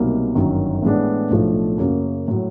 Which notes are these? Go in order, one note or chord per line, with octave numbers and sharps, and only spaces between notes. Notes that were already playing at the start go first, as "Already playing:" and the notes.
Already playing: C2 B2 F#3 A#3 D#4
G1 F#2 D#3 F#3
A2 E3 G#3 B3 D4
B1 A2 F3 A3 D4
F#2 C#3 F#3 A#3
A2 F#3